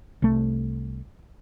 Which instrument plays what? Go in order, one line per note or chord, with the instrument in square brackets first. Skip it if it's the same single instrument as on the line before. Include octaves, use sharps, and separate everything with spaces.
[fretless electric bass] C2 A3